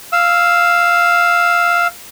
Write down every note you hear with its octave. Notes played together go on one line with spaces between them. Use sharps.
F5 E6